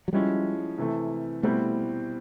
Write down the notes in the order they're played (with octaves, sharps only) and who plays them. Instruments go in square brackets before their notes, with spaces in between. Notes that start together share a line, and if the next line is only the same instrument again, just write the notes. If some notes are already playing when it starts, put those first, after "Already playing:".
[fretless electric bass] F#3
[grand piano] F3 G#3 C#4 E4 [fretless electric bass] G3
[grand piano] C3 E3 A3
[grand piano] B2 G3 C4 E4 [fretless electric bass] A3